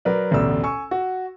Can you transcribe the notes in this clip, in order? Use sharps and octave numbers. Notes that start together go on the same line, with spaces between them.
F#3 A#4 B4 D5
A1 D2 B2 D5 E6
G#5 C#6 E6
F#4